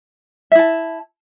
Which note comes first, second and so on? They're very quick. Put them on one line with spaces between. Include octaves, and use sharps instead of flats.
E5 E4 A5